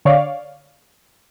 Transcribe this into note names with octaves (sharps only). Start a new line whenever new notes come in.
D3 C#5 D5 F5